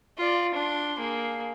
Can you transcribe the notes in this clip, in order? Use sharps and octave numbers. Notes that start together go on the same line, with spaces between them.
F4 D5
D4 C6
A#3 G#4